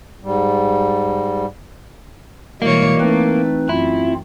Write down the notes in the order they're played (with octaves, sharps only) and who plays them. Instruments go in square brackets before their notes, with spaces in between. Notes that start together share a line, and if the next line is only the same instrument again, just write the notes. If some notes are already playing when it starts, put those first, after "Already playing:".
[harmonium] G#2 G3
[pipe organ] B2 G3 G#3 [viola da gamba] E3 C#5 [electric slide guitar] A#3
[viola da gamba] A3 [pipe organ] C4 D#4 B4
[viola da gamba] F#2 [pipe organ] C4 F4 [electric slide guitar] E4